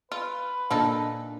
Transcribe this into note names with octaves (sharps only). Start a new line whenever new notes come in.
F4 B4
A#2 A#3 D4 D#4 A4